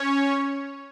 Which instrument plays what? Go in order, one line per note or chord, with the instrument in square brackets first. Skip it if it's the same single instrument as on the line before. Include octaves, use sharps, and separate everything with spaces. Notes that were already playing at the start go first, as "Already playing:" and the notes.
Already playing: [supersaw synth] C#4 C#5